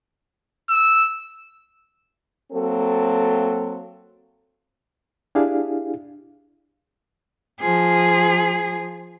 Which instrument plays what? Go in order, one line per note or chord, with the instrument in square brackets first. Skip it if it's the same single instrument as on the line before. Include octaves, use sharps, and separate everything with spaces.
[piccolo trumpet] E6
[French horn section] F#3 A#3 C4 A4
[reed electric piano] D4 E4 G4 G#4 F5
[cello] F3 G#4